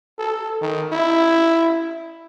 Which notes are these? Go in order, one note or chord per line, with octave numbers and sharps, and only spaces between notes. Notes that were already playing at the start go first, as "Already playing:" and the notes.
A4
D#3
E4